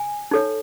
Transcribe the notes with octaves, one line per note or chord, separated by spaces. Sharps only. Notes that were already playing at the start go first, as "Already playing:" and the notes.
Already playing: G#5
D#4 A4 C#5